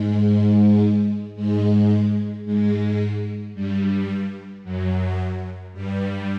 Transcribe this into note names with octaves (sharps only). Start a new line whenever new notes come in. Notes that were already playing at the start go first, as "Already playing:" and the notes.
Already playing: G#2 G#3
G#2 G#3
G#2 G#3
G#2 G#3
G2 G3
F#2 F#3
G2 G3